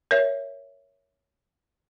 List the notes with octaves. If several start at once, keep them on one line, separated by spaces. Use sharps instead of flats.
A#4 C#5 E5